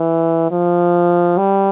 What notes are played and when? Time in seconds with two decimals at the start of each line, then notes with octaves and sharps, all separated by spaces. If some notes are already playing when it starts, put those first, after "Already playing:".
Already playing: E3
0.51 F3
1.38 G3